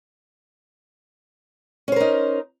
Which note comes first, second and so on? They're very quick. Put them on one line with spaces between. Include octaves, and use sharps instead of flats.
C#4 C5 A#4 D#4